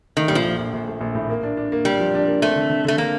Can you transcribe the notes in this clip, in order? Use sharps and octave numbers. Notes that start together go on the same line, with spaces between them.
D#3 A3
A#1 G3
F3
A#1
A#1
A#1
A3
A#1
A2
A#3
D4
D4
A#3
G3 A#3
F3
D4
A#3
A3 C4
D3
D3
D3 A3
D3 A#3